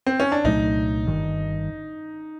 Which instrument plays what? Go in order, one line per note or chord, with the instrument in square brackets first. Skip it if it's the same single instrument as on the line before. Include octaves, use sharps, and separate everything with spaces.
[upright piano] C4
C#4
D4
[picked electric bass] C2 A#2 F#3 A3 [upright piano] D#4
[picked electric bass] G1 G2 D#3